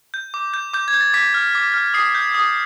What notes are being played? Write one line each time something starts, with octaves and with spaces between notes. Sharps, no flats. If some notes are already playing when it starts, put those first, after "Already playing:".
G6
D6
G6
D6 G6
G#6
G6
A6
D6 B6
F6
D6
F6
D#6 C7
G6
D#6